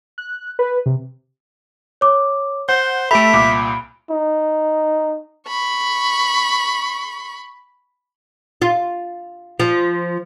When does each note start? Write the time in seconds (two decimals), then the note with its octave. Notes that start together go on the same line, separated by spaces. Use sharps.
0.18 F#6
0.59 B4
0.86 C3
2.01 C#5 D6
2.69 C5 F#5 G6 G7
3.11 A3 G4 A4 E5 B5 D7
3.33 C2 A#2 D6
4.10 D#4
5.47 B5 C#6
8.62 F4
9.60 F3